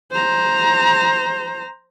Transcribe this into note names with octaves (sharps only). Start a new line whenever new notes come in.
C5 A#5